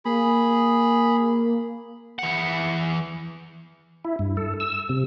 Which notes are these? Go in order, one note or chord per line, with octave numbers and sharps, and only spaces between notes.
A#3 G#4 B5
E3 F#5
E4
G2
A4
E6
C3